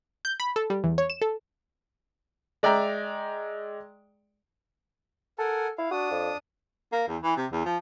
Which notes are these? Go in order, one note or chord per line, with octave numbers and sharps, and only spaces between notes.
G6
B5
A4
G3
E2
C#5
E7
A4
G#3 D5 E5 G5 A#5
A4 A#4 F#5 G#5
E4 F5
D4 F#4 D#6
F2
A#3
E2
E3
C3
E2
F3